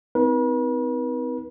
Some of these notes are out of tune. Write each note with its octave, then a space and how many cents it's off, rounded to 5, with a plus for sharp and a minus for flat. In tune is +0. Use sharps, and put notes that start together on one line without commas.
C4 -35 D#4 +30 B4 -40